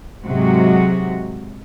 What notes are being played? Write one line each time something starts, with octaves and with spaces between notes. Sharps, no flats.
G#2 C3 F#3 G#3 F#4